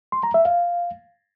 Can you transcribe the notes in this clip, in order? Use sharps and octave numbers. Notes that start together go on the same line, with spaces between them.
C6
A#5
E5
F5